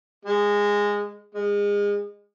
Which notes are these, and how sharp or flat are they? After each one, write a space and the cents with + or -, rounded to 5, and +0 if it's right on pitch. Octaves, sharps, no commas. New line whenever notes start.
G#3 -15
G#3 -30